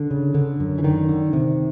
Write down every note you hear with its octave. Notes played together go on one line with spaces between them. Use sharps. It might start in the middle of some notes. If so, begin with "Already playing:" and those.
Already playing: D3
C#3
D3
F#2
E3
D3 D#3
D3
C3